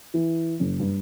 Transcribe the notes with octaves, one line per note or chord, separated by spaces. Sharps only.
E3
F#1
G2